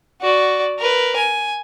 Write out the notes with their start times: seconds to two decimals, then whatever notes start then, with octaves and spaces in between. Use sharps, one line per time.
0.22 F#4 D5
0.79 A#4 B4
1.16 G#5